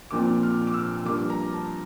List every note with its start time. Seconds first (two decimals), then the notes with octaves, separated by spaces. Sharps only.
0.11 A#1 A#2 F3 C4 D6
0.43 F6
0.67 D6
0.74 E6
1.05 G2 F3 A#3 D6
1.30 A#5
1.53 A5